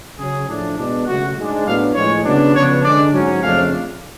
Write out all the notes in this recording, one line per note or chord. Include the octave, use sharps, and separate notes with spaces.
C#3 F#3 C#4 G#4
A2 F3 A3 D4
B2 G#3 B3 D4
C#3 F#3 A3 F#4
G#2 G#3 D4
A2 F#3 B3 D4 F5
A2 F3 G#3 C#5
C#3 F#3 B3 D4
C#3 F3 B3 D4 C#5
D3 G#3 D4 D5
G#2 F#3 C#4
F2 C#3 F3 A3 D4 F5